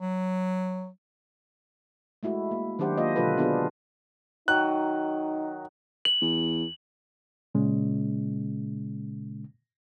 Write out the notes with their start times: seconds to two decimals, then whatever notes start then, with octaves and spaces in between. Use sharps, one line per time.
0.01 F#3
2.23 G#3 A3 E4 F#4
2.51 A#3
2.79 D#3 F#3 D4 G4 C5 F#5
2.98 A#3 F4 C5 D#5
3.16 B2 D3 F#3 F4 A4 B4
3.38 B3 D4 F4 G#4
4.48 D#3 F#3 D#4 F#6
6.05 F#7
6.21 E2
7.55 A#2 C#3 G#3 C#4